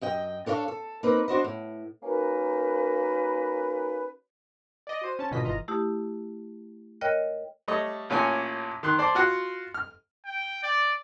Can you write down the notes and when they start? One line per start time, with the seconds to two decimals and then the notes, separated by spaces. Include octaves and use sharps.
0.01 F#2 D#5 G5
0.46 D4 A4 C#5 D#5 F5
0.68 A4
1.03 A#3 C4 D#4 B4
1.28 D4 F#4 C5 D#5
1.44 A2
2.03 A#3 C#4 D#4 F#4 A#4 B4
4.87 D5 D#5
5.01 F#4 C5 D#7
5.19 C#4 A5
5.31 G#1 B2 D3 F4 D#5 B6
5.44 G1 E3 F4 D#5 A#5
5.68 A3 E4 G4 D#6 E6
7.01 A#4 C#5 D#5 G5 F6 F#6
7.68 G3 A3 C#5 D#5
8.10 A1 A#2 C#4 C#5 G#5
8.83 D#3 C6 F#6
8.98 C5 D5 A5 C6
9.15 F4 F#4 F#5
9.74 F6
10.25 G5
10.63 D5